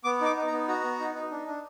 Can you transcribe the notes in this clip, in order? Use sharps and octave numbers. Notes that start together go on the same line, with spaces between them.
B3 D6
D#4 D6
D#4
A#5
B3
F#4 A#5
B3
D#4
D#4
D4
D4